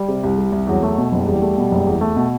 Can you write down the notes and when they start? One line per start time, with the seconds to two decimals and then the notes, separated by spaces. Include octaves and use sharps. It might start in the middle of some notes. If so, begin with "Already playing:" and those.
Already playing: G3
0.08 C3
0.24 C2
0.38 G3
0.52 C2
0.67 E2 F#3
0.83 A3
0.98 B2
1.12 F#1 G3
1.27 E2
1.42 A3
1.57 B2
1.71 F#1
1.87 E2
2.01 A3
2.16 B2